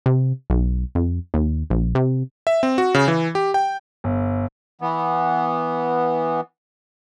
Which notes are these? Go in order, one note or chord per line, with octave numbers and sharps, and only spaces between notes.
C3
B1
F2
D#2
A#1
C3
E5
C4
F#4
C#3
E3
G4
G5
G1
E3 B3